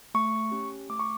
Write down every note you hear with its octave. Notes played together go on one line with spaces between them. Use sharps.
A3 C#6
C#4 G4
A3 D6
C#6